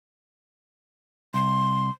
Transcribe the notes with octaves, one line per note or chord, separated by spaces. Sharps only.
C2 C6